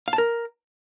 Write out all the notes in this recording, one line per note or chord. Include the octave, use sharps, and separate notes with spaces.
F5
A5
A#4